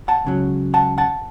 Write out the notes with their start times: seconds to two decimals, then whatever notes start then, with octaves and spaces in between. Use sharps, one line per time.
0.08 F#5 A5
0.24 C#2 C#3 F#3
0.74 F#5 A5
0.98 F#5 A5